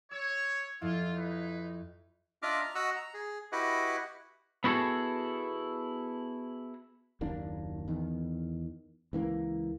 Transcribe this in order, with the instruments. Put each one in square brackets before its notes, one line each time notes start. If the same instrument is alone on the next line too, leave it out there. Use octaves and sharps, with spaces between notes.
[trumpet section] C#5 [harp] E6
[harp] F2 E4 [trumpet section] F4
[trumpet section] D#4 B4
[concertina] D4 F4 D#5 E5 D6 F6
A#5
F#4 D#5 F#5 E6
A#5
G#4
E4 F#4 G4 B4 D#5 F#5
[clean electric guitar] B3 E4 F#4 G#4 A4
[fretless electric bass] F#1 D#2 A#3 D4
E2 D#3
C#2 E3 A#3